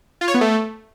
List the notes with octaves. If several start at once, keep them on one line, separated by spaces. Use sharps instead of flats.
F4
C#5
B3
A3